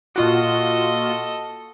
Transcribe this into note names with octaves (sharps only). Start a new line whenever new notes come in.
A#2 F4 F#4 A4 D#5